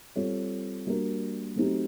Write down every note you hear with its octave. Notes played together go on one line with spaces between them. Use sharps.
G3 C4 F4 A4 C#5
G3 A#3 D4 F#4 A#4
F#3 A3 C4 D#4 G4